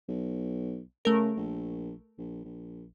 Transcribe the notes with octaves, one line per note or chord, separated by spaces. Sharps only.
B1
C#3 A3 A#4
A#1
A#1
A#1